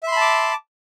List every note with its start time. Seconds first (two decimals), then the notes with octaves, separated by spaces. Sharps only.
0.03 E5
0.08 C6
0.12 B5
0.17 A5
0.21 D6